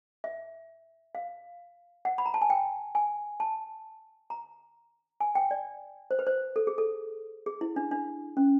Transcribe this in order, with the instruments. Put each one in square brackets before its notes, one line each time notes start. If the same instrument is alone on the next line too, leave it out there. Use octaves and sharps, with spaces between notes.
[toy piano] E5
F5
F#5
B5
A#5
A5
G#5
G5
G#5
A5
A#5
G#5
G5
D5
C5
B4
C5
A4
G#4
A4
G#4
E4
D4
D4
C#4